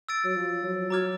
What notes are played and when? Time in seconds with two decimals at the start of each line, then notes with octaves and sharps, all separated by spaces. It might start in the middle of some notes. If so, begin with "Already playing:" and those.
0.09 E6 A6 D7
0.24 F#3
0.36 F3
0.64 F#3
0.90 F#3 A#5 D6 F6 G#6